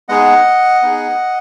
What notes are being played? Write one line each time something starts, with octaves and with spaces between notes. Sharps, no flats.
G#3 B3 D#4 G#4 D#5 F#5
B3 D#4 G#4